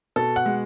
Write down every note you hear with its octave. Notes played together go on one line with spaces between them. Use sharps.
B2 A4
F#5
G#3